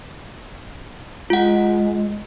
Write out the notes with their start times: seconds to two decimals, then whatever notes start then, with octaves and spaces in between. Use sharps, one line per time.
1.30 G#3 F4 F#5